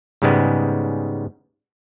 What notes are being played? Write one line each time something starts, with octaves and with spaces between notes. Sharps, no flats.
G#2 C#3 G3 G#3 B3